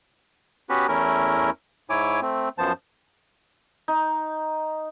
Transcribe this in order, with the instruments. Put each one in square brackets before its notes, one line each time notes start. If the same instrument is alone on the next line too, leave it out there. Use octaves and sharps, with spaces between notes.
[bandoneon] B3 C#4 F#4 G4 B4
E2 A3 C#4 E4 A#4
G#2 E4 C#5 G#5 D6
A3 C4
F#2 F3 B3 C5 A5
[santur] D#4